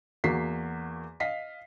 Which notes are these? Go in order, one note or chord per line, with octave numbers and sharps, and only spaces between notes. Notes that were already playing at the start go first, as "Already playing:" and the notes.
E2 A#3 F#4 B6 C7
D#5 F5 B6 C7